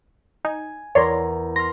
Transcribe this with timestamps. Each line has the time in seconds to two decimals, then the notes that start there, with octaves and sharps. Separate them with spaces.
0.45 D#4 G#5
0.95 E2 A#4 C#5 D5 C6 A#6
1.56 C6 F6 A#6